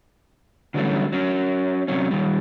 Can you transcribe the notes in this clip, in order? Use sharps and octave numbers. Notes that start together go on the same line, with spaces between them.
D3 E3 F#3 G3 A3 C#4
F#3 C#4
C3 F#3 C#4
D#3 G3